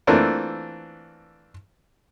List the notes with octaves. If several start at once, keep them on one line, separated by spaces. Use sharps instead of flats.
E3 A3 A#3 C4 D4 F4